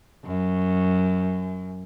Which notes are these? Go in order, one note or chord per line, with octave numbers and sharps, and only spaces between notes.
F#2